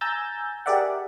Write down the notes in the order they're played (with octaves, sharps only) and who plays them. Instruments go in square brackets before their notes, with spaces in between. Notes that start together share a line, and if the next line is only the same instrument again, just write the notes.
[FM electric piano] G#5 A#5 E6 G6 A6
G4 G#4 A#4 D5 E5 F#5